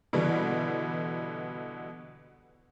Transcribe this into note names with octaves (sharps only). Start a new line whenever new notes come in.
B2 D3 E3 G3